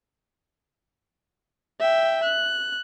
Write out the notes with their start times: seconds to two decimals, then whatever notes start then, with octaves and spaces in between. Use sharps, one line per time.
1.80 E5 G5
2.23 F#6